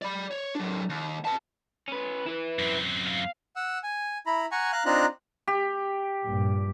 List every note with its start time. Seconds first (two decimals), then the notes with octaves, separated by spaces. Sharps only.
0.02 D5 B5
0.31 C#5
0.55 F#3 D4
0.89 D#2
1.25 B4 A5
1.88 C#4 B4
2.26 E4 B4
2.59 F#2 C4
3.07 F5
3.56 F#5 E6
3.83 G#5
4.26 E4 A#5 B5
4.52 F#5 G#5 A#5 C#6
4.73 F5 A#5 F#6
4.86 C4 D4 D#4 F4 A#5 F#6
5.47 G4
6.24 A#1 G2 A#2